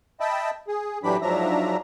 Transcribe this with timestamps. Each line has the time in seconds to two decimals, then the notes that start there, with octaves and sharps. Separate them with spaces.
0.20 D#5 E5 G5 A5 B5
0.68 G#4
1.03 A2 E3 F#3 D4 G4 B5
1.21 G#2 F3 F#3 D4 E5 A#5